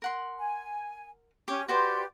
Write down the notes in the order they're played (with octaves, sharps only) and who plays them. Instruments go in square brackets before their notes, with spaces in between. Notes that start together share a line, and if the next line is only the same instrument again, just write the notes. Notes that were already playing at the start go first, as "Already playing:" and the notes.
[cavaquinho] A#4 F#5 C6
[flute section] G#5
[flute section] C#4 [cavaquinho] G4 C#5
[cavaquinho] F#4 C5 D5 [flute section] G4 B4 C6